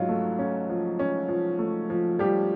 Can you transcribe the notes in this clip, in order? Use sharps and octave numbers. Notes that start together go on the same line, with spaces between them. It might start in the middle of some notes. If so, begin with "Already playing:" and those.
Already playing: G#2 F#3 C#4 F4
A3
C#4
F3
C#4
F3
A3
F3
F3 G3 G4